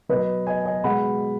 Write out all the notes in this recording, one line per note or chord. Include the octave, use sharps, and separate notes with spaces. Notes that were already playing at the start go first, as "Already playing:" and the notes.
B2 F#3 B4 D#5
D#5 G#5
D#5 G#5
B2 G#3 F#5 B5